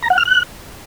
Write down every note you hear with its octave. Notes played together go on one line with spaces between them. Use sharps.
A#5
F#5
F6
F#6